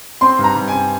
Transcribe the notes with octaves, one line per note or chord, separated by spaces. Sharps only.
C4 C6
G2
A#5
G2
G#5
C4